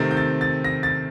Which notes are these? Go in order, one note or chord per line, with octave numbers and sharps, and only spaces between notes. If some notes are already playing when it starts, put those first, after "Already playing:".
Already playing: C3 D#3 A3 C4 A6
G6
A6
A6
A#6
A6